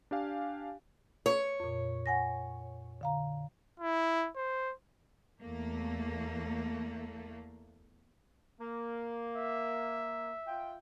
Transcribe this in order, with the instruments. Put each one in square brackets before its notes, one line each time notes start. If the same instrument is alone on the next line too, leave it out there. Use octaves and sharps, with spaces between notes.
[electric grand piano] D4 G4 F5 G#5
[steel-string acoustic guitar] C#5
[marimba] F2 A#2
F#5 G#5 A#6
D3 F5 A#5
[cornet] E4
C5
[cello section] E2 A3 A#3
[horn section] A#3
[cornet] E5
[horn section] F4 G5